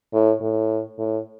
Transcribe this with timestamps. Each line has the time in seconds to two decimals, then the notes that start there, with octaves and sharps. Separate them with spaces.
0.13 A2
0.41 A2
0.98 A2